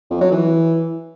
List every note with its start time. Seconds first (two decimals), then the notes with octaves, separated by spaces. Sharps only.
0.10 F2
0.21 F#3
0.32 E3